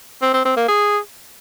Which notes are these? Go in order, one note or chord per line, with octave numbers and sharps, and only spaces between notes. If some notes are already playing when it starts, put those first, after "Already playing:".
C4
C4
C4
A#3
G#4